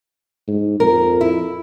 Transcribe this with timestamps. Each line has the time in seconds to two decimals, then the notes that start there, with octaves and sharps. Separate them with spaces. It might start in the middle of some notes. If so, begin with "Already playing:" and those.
0.48 G#2
0.80 F2 A#4
1.21 E4